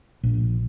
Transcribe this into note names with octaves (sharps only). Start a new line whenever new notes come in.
A#1